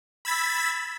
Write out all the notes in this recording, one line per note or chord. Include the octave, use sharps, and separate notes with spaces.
B5 E6 G#6 A6 B6